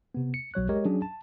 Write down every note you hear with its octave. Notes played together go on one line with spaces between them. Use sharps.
C3 B3
C#7
B1 F#3 C#5 F#6
G#3 G4 A#4 C#5 D#5
F#3 C#4 D4 G#4
A5